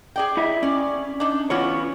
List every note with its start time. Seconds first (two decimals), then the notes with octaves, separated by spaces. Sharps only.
0.16 G#4 D5 G5
0.37 E4 D#5 E5
0.63 C#4 D5
1.20 D4 D#4
1.50 E3 B3 C#4 F4 F#4 C#5